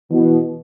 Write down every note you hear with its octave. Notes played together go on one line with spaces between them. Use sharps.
B2 E3